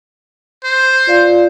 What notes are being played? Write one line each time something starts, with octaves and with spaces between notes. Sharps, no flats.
C5
F4 D5 F5